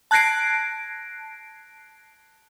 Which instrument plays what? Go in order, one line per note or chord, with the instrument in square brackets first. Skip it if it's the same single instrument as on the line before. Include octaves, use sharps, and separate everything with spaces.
[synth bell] A5 F#6 G#6 A#6 C7 D7